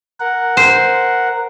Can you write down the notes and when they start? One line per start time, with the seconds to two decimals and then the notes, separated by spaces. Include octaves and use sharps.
0.20 A#4 F#5
0.57 C5